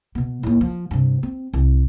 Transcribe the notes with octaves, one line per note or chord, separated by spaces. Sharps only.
B2 B3
D#2 A2
F3
G2 C3
C4
C2